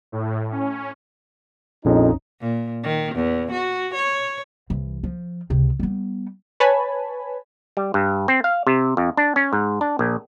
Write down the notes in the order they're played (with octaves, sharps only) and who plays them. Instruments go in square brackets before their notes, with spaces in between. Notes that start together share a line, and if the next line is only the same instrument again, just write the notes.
[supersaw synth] A2
C#4
[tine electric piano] A#1 F2 [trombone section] C#4 D#4
[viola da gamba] A#2
D#3
E2
F#4
C#5
[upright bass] C2 E3
F3
C#2 C3
G3 B3
[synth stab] B4 C#5 G#5 A5 B5
[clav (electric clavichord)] G3
G2
C4
F5
C3
F2
D4
C#4
G#2
D4
A#1